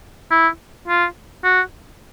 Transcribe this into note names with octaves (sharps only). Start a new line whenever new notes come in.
E4
F4
F#4